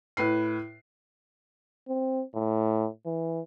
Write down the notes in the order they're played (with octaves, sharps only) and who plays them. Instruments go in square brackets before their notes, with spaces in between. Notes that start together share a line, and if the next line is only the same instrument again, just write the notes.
[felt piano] A2 B4 C7
[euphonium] C4
A2
E3